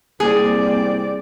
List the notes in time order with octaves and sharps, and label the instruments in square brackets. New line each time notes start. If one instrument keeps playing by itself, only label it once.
[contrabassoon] C2 [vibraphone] A#3 [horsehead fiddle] C4 D5 [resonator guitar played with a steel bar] G#4